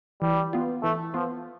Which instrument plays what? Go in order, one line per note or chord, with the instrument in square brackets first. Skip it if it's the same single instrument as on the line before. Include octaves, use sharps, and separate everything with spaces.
[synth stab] E3 [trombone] G3
[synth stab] B3 F4
[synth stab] E3 [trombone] A3
[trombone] F3 [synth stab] B3 F4